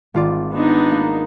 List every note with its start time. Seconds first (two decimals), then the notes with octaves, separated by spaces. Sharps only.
0.14 G#1 F4 D5
0.53 B3 D4 D#4
0.91 A#3